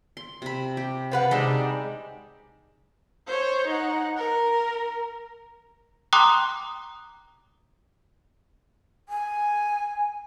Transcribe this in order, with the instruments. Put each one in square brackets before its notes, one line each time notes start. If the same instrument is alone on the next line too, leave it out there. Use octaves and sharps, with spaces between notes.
[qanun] C6
C3 B5
G4
[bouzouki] F3 B4 F#5
[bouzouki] C3 G3 D4 [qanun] G#3 D#4 D#5
[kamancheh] C5 C#5
D#4 F#5
A#4
[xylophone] G5 A#5 C6 D6 D#6 F#6
[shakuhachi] G#5